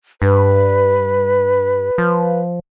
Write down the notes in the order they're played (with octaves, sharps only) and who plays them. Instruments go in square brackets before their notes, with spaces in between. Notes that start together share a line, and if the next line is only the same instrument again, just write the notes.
[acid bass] G2 [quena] B4
[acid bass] F3